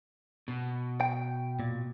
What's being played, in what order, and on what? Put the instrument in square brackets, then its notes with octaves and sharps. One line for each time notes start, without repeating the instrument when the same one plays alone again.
[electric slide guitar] B2
[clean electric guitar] G5
A#2